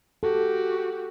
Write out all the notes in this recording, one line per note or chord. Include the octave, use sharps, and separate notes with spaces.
F#4 G4 A4